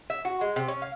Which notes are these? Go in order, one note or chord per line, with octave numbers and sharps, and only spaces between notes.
E5
F#4
G#3
C3
C#4
F5